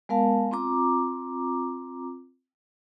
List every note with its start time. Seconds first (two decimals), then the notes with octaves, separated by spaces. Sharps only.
0.09 G#3 B3 A#4 F5 A5
0.51 C4 F4 A#5 D6